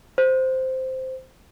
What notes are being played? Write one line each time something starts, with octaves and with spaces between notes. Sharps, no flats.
C5